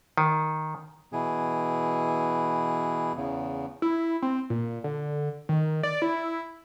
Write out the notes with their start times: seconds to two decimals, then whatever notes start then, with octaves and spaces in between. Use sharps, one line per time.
0.18 D#3
1.13 B2 E3 G#4
3.16 E2 C#3
3.82 E4
4.22 C4
4.50 A#2
4.84 D3
5.49 D#3
5.83 D5
6.02 E4